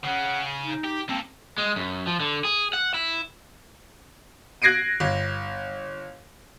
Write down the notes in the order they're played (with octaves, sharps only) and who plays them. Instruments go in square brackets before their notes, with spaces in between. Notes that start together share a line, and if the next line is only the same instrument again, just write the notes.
[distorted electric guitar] C#3 C#4 [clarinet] F#5
[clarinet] D#4
[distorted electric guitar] G4
[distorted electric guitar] A#3 A4 [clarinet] C4
[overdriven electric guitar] G#3
F#2
F3
D3
G#4
F#5
E4
[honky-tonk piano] F#6 G#6 A#6 C7 D7 D#7
G1